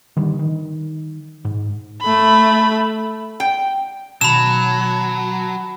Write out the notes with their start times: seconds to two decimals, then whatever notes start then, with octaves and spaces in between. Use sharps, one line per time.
0.17 D3 D#3 G3
0.39 D#3
1.45 G#2
2.02 A3 B5
3.40 G5
4.21 B2 D#3 F#3 A5 B5 E7